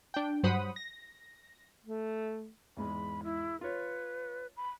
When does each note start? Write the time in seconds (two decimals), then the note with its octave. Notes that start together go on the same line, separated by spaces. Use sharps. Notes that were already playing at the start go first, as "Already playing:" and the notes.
0.14 D4 G5
0.43 G2 F#3 C5 F#5 B5 D#6
0.76 A#6
1.85 A3
2.77 E2 G#2 G#3 B5
3.24 E4
3.61 F4 B4 C#5
4.56 B5